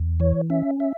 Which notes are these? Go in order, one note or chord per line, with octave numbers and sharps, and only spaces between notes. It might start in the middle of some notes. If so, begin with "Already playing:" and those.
Already playing: E2
E3 C#5
C#4 E5
E5